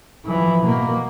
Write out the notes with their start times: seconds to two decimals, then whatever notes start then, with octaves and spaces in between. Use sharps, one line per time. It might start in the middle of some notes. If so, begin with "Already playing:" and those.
0.25 E3 F3
0.65 B2 A#3